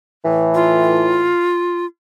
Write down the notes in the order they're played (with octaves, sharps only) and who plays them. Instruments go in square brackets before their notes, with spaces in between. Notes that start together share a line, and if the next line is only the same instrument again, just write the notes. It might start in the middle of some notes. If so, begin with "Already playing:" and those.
[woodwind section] A2 E3
[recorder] F4